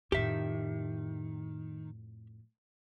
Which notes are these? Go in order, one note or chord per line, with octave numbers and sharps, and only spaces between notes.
F2 A2 D#3 G4 E5